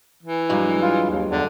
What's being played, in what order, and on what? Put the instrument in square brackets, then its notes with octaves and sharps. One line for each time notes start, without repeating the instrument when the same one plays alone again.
[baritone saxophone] E3
[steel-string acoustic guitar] G2 F#3 G#3
[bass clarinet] F4
D#2
[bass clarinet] E2 [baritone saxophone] D3